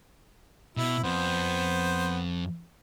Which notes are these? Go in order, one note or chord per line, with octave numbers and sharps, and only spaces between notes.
B2 E4
F2 B3 C5